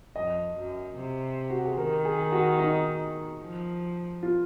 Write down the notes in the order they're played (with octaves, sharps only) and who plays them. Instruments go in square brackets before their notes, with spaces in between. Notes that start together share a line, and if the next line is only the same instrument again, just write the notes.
[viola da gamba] F2 [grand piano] D#5
[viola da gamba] F#2
C3
[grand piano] F#4
G#4
[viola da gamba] D#3 [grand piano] A#4
[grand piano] G#4
F#4
D#4
[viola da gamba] F3
[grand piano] F4